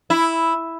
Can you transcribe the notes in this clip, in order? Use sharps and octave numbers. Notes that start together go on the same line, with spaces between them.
E4